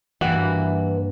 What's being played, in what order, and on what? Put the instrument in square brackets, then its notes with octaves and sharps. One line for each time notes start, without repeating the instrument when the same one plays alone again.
[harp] G2 A#3 [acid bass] E3 [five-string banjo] F#4